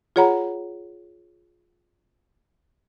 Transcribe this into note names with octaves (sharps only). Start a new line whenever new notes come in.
F4 G#4 C#5 F#5 A#5 B5